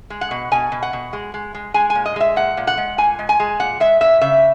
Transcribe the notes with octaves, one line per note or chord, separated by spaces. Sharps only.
G#3
F#5
B2
B2 G#5
B2
F#5
B2
G#3
G#3
G#3
G#3 G#5
G#5
A#2
D#5
G#3 E5
A#2 F#5
A#2
F#5
G#3
A#2 G#5
G#3
G#5
G#3
A#2 F#5
G#3 E5
A#2 E5
C#3 E5